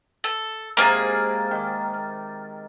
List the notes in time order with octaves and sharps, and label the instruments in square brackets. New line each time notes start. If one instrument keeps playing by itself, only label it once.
[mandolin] A4
[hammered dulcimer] G#2 C3 A#4 [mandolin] A#3 G#4 [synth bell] A#5 F6 A6
[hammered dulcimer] D#3 D6